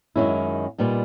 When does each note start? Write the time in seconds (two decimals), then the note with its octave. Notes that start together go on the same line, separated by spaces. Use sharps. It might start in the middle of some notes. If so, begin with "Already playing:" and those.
0.16 F#2 D#3 G#3 C#4 E4
0.78 A#2 G3 B3 D#4